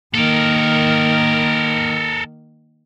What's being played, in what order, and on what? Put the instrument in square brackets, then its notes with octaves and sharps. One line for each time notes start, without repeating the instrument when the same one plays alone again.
[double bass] D#3 A#3 [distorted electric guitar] A4 A#4